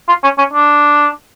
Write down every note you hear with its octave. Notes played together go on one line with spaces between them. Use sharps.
F4
C#4
C#4
D4